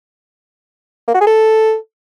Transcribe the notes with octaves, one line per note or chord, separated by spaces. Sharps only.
A#3
F#4
G#4
A4